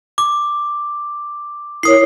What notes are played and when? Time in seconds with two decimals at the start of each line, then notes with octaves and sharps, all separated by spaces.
0.18 D6
1.83 E4 A#4 C#5 D#6 C7